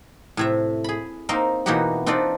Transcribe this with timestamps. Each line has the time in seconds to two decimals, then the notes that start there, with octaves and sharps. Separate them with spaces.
0.37 A2 C3 E5
0.84 G#4 B5
1.29 A#3 C4 D#4 A#4 D#5 F5
1.66 B2 E3 A#3 D#4 F#4 G4
2.06 C4 D4 D#4 F4 B4 D5